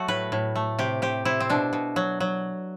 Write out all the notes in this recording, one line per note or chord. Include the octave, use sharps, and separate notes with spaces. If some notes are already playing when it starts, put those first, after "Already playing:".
Already playing: F#3 A3 F#4
A2 B4
A2
A3
C3 G4
C3 G4
C3 E4
C4
B2 D4
B2
F#3
F#3